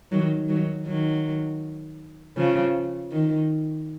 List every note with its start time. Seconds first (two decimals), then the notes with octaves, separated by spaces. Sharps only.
0.12 D#3 F#3
0.49 D#3 F#3
0.86 D#3 F#3
2.37 C#3 F3
3.12 D#3